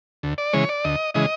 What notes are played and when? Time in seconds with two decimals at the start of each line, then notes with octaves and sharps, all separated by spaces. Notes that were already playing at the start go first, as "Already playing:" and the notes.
0.23 D2
0.38 D5
0.53 C#3 E3 G#3 C#5
0.69 D5
0.84 D2 D#5
1.14 C#3 E3 G#3 D#5